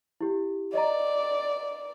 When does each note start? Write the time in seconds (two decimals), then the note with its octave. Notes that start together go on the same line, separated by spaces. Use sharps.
0.21 E4 G4
0.74 D5 D#5 A#5